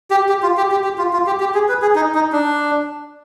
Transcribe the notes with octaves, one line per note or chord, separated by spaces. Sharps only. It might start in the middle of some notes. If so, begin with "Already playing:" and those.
G4
G4
F4
G4
G4
G4
F4
F4
G4
G4
G#4
B4
G#4
D#4
D#4
D4